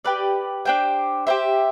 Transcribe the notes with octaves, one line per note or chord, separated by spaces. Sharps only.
G4 B4 D5
D4 G4 C5 G5
G4 C5 E5